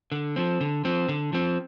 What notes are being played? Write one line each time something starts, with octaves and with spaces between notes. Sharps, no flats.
D3
F3 C4
D3
F3 C4
D3
F3 C4